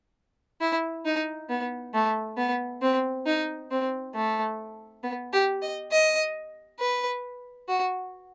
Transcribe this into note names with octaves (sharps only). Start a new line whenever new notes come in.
E4
D#4
B3
A3
B3
C4
D#4
C4
A3
B3
G4
D#5
D#5
B4
F#4